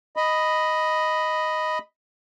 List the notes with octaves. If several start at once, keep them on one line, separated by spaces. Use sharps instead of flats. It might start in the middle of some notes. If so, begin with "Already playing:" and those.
D#5 B5